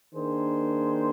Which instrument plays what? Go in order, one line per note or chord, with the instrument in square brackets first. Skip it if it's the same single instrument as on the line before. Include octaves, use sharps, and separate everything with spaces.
[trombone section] D#3 A#3 D4 G#4 C5